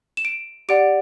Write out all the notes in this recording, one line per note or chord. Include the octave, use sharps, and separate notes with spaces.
E7
D7
G4 D5 F#5 D7